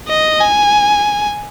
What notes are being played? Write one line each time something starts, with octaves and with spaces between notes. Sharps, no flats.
D#5
G#5